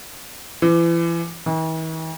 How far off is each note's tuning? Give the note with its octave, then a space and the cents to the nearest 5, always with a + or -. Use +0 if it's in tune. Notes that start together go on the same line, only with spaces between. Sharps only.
E3 +35
E3 -45